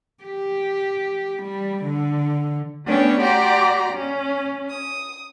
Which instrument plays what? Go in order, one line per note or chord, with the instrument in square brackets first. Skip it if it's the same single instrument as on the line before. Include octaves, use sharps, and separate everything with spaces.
[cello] G4
G3
D3
[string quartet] A3 B3 C#4 D4 C#5 G5
F#4 G4 D5 A#5 C6
C#4
D#6